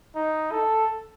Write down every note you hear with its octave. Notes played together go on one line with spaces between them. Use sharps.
D#4
A4